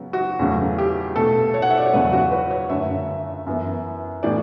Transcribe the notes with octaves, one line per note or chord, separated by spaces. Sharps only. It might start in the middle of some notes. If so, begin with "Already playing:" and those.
Already playing: C#3 F#3 B3
F#4
E2 C#3 F#3 A3
G4
B2 A3 A4
C#5
F#5
E5
D5
C#5
E2 C#3 F#3 B3 B4
F#4
B4
C#5
F#2 D3 A3 E5
F#2 E3 B3
A2 E3 B3 D5